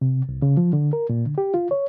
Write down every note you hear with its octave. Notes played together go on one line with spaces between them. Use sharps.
C3
C2
C#3
F3
D3
A#4
A#2
D3
G4
F4
C#5